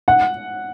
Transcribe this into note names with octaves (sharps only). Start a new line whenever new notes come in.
F#5